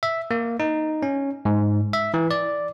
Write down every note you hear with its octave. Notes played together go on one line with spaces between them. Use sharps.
E5
A#3
D#4
C#4
G#2
E5
E3
D5